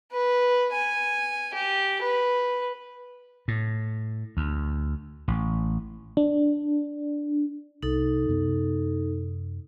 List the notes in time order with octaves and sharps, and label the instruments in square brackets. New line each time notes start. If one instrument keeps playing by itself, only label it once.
[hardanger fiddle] B4
G#5
G4
B4
[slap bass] A2
D2
A1
[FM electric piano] D4
[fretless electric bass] C2 [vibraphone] D#4 A4
[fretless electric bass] F#2 C3 B3